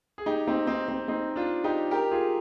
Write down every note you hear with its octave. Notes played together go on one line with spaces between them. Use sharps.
G#4
D#4 G4
C4 D#4
C4 D#4
C4
C4 D#4
D4 F4
D#4 G4
G4 A#4
F4 G#4